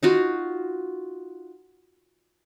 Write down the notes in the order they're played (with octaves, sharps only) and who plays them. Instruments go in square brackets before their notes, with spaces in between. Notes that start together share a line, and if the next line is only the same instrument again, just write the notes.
[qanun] D#4 F4 F#4